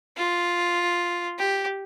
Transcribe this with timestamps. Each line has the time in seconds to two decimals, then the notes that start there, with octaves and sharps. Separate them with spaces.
0.17 F4
1.38 G4